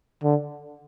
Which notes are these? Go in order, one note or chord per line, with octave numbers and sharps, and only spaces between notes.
D3